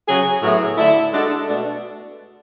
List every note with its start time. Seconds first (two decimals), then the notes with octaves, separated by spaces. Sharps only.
0.07 C#3 F#3 C#4 G#4
0.42 A2 F#3 B3 E4 G#4
0.78 D3 A3 E4
1.13 G#3 D4 F#4 A4
1.48 B2 A3 D4 F#4 A4